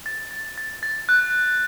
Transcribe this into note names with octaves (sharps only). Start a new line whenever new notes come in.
A6
A6
A6
A6
F#6